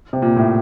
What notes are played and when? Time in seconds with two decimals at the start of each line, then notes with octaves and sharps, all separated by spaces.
0.13 C3
0.22 A#2
0.37 A2